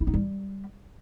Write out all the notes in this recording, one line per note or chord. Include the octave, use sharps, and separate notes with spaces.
E4
D#4
G3